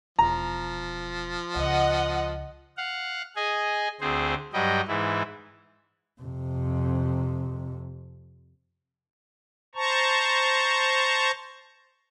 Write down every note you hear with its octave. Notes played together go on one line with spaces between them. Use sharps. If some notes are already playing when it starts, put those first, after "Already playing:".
E1 F3 A#5
C#2 D#5 F#5
F5 F#5
G#4 D#5 G#5
D2 C4 G#4 C5
G2 F#3 G3 D#5 G5
G#2 E3 E4
F2 C3
C5 A5 A#5 C#6